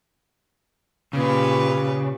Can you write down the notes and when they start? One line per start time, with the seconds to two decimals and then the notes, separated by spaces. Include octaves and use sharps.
1.13 A#2 C#3 G4 B4